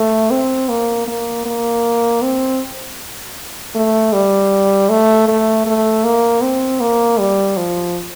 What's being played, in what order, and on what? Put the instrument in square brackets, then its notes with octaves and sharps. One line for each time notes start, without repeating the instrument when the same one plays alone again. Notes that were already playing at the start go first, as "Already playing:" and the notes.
Already playing: [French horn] A3
C4
A#3
A#3
A#3
C4
A3
G3
A3
A3
A3
A#3
C4
A#3
G3
F3